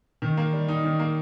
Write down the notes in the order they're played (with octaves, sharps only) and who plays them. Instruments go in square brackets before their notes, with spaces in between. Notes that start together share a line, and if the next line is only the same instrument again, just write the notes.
[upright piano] D#3
A#3
G3
D#4
D#3
A#3